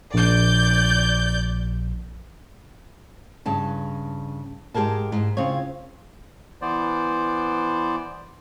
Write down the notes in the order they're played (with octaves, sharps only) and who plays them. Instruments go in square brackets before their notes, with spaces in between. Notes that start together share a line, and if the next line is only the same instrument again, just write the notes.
[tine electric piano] A#1 [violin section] D5 G6
[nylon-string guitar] G2 C#3 A5
G#2 G4 G#4 A#4 A5
G#2
C#3 C4 F4 C#5
[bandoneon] E3 B3 C5 D5